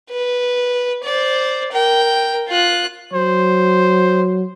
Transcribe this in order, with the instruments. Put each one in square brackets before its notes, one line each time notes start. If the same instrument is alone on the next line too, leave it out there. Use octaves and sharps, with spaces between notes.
[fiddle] B4
C5 D5
A#4 G5
F4 F#6
[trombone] F#3 [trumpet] C5